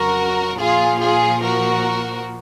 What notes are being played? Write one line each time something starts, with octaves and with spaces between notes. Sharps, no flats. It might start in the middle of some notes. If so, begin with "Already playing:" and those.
Already playing: F2 C#3 F#3 F#4 A#4
A#2 F3 F4 G#4
F4 G#4
F#4 A#4